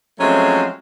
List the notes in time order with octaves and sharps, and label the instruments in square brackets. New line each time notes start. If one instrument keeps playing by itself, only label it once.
[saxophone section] F3 F#3 G#3 A3 C4 C#4